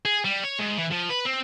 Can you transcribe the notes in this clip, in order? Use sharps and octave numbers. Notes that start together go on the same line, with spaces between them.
G#4
G3
C#5
G#2
E3
F3
B4
C4